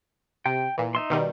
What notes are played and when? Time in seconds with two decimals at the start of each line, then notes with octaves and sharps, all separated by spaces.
0.46 C3 G5
0.78 A#2 E3
0.95 D#4 E5 C6
1.10 B2 D#3 G3